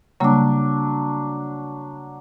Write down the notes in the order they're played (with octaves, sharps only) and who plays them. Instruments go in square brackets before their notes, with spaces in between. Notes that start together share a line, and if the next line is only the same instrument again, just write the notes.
[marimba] C#3 G3 A#3 [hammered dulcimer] F#3 D4